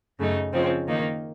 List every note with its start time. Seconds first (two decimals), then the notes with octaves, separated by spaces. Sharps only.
0.19 F#2 C#3 A3 D#4
0.53 C#3 F3 C4 D#4
0.88 D#3 A#3 D#4